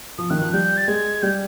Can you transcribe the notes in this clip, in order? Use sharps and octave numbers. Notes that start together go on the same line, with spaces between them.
F3 D#6
D#3 F#6
F3 F#6
G3 G6
A6
G#3 G#6
G3 G6